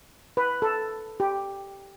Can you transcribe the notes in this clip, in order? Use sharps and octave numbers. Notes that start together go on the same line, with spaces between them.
B4
A4
G4